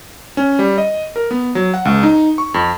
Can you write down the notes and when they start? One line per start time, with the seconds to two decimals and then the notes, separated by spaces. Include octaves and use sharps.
0.37 C#4
0.59 G3
0.78 D#5
1.16 A#4
1.31 B3
1.55 F#3
1.74 F#5
1.85 C#2
2.03 D#4
2.38 C#6
2.54 F2